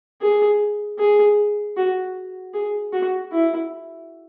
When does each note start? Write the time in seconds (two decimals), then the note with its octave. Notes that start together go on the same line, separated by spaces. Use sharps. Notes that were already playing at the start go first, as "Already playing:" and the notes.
0.21 G#4
0.98 G#4
1.77 F#4
2.54 G#4
2.93 F#4
3.32 E4